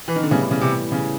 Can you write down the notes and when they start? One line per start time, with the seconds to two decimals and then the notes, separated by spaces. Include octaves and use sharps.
0.08 E3
0.16 D#3
0.23 D3
0.31 A2 C#3 E3 G3 B3
0.51 C#3
0.61 C3
0.92 C#3